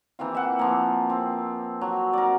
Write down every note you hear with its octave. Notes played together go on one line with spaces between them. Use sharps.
E3 A#3 C4 F4
E5 F#5
F3 A#3
C4
F#3
A#4 D5